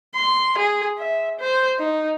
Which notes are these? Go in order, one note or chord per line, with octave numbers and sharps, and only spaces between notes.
C6
G#4
E5
C5
D#4